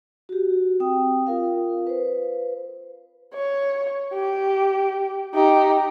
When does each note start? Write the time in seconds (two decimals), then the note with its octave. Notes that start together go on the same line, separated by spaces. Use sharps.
0.29 F#4 G4
0.80 C4 G5 D#6
1.27 F4 A#4 F5
1.87 B4 C5
3.34 C#5
4.14 G4
5.34 D#4 G4